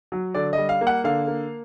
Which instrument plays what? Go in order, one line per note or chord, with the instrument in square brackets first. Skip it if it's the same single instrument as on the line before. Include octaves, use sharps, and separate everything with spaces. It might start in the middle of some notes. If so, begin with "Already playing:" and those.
[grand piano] F#3
D3 D5
G3 D#5
F5
A#3
F#5
D3 F5
A#3